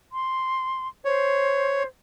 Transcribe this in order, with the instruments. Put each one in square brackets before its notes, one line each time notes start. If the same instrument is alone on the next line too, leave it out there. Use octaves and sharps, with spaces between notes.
[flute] C6
[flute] C5 [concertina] C#5